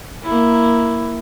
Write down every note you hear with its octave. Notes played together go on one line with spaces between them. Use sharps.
A#3 E4